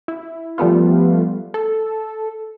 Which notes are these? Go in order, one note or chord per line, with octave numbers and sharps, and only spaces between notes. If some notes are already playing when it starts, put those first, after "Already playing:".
E4
F3 G3 A3 B3 F4
A4